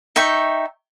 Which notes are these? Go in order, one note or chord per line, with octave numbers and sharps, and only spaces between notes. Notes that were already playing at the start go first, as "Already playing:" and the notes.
D#4 E5 G5 C#6